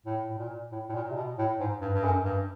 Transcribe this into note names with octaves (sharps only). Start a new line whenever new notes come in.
A2
A2
A#2
A2
A2
A#2
C3
B2
A2
G#2
G2
G2
F#2
G2